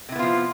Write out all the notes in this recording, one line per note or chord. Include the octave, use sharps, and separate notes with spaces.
C3 F3 B3 E4 F4